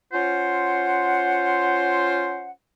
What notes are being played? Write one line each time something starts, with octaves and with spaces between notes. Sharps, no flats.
C#4 F4 C5 F#5